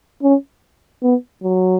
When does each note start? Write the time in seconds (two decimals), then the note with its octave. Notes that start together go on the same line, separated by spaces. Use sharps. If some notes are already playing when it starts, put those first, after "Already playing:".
0.23 C#4
1.03 B3
1.43 F#3